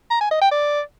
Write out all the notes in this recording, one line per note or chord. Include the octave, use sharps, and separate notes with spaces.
A#5
G#5
D#5
G5
D5